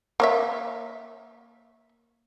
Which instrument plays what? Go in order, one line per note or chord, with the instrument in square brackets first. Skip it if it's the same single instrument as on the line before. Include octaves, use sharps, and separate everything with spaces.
[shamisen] A#3 C#5 E5